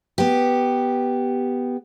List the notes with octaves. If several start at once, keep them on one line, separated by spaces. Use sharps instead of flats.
B3 G4